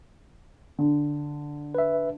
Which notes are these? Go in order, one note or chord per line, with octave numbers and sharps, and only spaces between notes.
D3
B4 E5